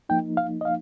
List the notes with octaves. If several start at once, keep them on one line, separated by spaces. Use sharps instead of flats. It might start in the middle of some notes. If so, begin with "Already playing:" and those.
F3 A#3 D#4 G5
F5
D#5
F5